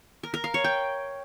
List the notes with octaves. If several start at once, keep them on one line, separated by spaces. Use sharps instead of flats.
A#4
A#4
F5
C#5
G5